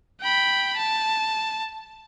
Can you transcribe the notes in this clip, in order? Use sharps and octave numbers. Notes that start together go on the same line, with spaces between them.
G5 B5
A5